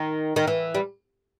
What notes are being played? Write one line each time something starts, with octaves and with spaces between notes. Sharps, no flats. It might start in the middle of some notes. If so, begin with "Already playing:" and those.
Already playing: D#3
D#3
E3
G3